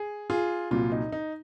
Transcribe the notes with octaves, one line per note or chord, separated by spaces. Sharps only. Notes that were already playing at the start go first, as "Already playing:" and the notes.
Already playing: G#4
F4 G#4
C2 A#2 F#3 F4
D#4
D#4